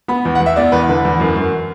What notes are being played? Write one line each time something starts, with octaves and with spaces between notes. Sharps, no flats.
B3 B5
E2
F#5
E2
E5
B3 D5
E2 B4
D3 B4
E2
F#2
F#2